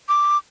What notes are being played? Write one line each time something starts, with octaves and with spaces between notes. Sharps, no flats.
D6